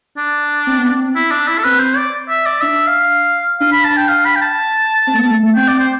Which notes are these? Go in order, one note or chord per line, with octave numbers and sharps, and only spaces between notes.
D4
C4
B3
C4
E4
D4
E4
A4
C4 B4
C5
D5
E5
D5
D4 E5
F5
D4 F5
B5
A5
G5
F5
B5
G5
A5
C4
A3
B3
A3
A3
C4 G5
D5
C5